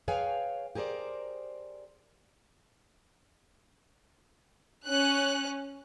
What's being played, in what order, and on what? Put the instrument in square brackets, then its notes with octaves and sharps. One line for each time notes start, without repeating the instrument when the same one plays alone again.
[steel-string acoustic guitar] G#4 B4 C#5 F5 G5 G#5
G4 G#4 A#4 C5 D5
[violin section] C#4 F#6